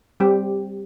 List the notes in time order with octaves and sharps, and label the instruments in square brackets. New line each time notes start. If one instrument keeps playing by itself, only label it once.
[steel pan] G3 C4 G4